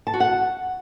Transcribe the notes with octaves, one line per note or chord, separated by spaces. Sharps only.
A5
F#4
F#5